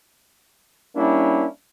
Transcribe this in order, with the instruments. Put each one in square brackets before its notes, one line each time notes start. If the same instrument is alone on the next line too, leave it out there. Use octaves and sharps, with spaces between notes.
[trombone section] G3 A#3 C#4 D4 E4